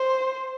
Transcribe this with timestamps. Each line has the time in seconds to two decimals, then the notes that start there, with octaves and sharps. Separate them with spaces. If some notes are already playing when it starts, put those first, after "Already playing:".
Already playing: C5